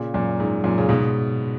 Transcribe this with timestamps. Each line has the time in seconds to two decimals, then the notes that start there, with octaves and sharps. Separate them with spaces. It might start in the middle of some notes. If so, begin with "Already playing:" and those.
Already playing: A#2 C#3
0.14 F#2 A#2
0.40 G#2
0.64 F#2 A#2
0.78 C#3
0.89 G#2 B2